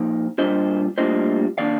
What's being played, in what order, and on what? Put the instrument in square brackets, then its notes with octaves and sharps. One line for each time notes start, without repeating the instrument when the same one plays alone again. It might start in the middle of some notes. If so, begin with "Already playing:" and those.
Already playing: [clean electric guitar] A#2 F3 A#3 D#4
A#2 G3 A#3 D4 F4 C5 D#5
A2 G3 A#3 D4 F4 C5 D#5
D#3 A#3 D4 D5 F5